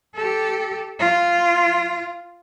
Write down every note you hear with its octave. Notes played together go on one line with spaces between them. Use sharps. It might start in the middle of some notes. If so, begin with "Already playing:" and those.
G4 A4
F4